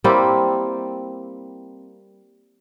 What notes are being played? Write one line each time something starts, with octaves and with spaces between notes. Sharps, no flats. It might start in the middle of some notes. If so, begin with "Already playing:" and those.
G3 A#3 C4 E4